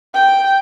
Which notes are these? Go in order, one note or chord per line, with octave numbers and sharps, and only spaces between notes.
G5